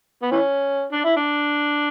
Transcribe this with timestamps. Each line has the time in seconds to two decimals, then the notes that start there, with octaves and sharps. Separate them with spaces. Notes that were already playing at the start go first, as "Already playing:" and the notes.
0.22 B3
0.31 E3 C#4
0.92 D4
1.05 E4
1.17 D4